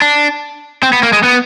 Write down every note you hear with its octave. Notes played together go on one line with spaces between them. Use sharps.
D4
C4
B3
A#3
G#3
B3